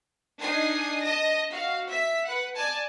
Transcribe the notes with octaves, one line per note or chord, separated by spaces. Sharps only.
D4 D#4 G#5 D#6 C7
D#5 A5 D#6 A#6
F#4 F5
E5 B6
B4 F#5
D5 G#5 A5